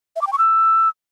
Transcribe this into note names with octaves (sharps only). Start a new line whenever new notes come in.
E5
D6
G5
C#6
E6